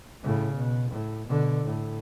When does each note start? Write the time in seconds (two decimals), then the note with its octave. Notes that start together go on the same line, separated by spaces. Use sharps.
0.23 A2 C#3
0.55 B2
0.91 A2
1.28 B2 D3
1.65 A2